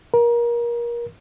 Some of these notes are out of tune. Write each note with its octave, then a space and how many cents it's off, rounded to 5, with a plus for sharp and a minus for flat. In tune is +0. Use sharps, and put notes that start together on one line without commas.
A#4 +25